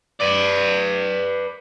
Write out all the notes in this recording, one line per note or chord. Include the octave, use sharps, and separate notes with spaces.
B4 D5